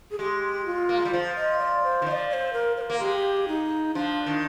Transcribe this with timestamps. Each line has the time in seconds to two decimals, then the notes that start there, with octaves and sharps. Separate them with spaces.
0.11 G#4
0.19 G#3 G4
0.66 F4
0.89 A#3
0.97 G#3
1.05 G3
1.13 F3 C5
1.36 D#5
1.59 D5
1.83 C5
2.02 D#3
2.07 F3 D#5
2.12 D5
2.30 D5
2.33 C5
2.53 A#4
2.77 C5
2.81 A#4
2.90 A#3
3.00 G#3 G4
3.48 D#4
3.94 F3 D4
4.26 D#3